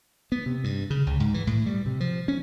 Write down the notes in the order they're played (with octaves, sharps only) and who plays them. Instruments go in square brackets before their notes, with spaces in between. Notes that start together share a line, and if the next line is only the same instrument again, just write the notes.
[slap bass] B3
C3
G2
C#3
C#2
G#2
E3
A2
G3
C3
F3
C#4